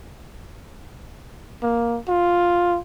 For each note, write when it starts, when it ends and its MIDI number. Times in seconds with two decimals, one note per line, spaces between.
1.63 1.99 58
2.09 2.78 65